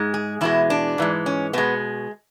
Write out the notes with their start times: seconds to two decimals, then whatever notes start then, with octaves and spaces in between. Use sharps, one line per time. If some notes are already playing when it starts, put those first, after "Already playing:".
Already playing: G#2 G#3
0.14 G#4
0.41 E2 B2 G#3 E4
0.70 D4
0.98 G#2 E3 G#3
1.26 C#4
1.53 B2 G#3 B3